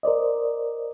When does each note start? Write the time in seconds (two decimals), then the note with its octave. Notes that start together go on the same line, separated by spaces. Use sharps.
0.03 A#4 C5 D5 D#5